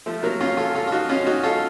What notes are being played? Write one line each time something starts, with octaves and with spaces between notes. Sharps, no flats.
F3 A3
F#3 A#3
C#4 F4
F4 A4
F4 A4
F4
D#4 F#4
C#4 F4
D#4 F#4
F4 A4